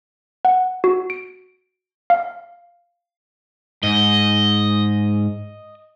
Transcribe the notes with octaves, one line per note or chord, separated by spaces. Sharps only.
F#5
F#4
D7
F5
G#2 D#5